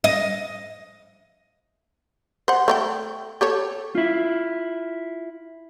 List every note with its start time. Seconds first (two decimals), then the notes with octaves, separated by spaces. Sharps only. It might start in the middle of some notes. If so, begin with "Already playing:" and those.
0.04 D#5
2.48 C5 F#5
2.68 A3 C#5 G5
3.41 G4 A4 C#5
3.95 E4 F4